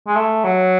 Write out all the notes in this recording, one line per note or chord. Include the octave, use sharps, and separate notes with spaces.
G#3
A3
F#3